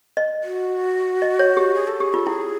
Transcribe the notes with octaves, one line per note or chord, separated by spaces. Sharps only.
D#5
F#4
D#5
C#5
G4
G#4
A4
G4 G#4
F4 A4
E4 G#4